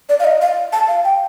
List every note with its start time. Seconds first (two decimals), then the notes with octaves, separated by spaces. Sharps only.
0.09 D5
0.20 F5
0.24 D#5
0.42 F5
0.73 A5
0.88 F5
1.05 G5